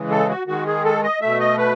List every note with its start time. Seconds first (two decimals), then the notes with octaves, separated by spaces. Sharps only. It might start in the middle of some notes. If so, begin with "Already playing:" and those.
Already playing: C#3 E3 G#3
0.11 A4
0.29 F#4
0.47 D#3 G#3 F#4
0.66 G#4
0.85 A4
1.03 D#5
1.21 B2 A3 E5
1.40 D#5
1.58 B4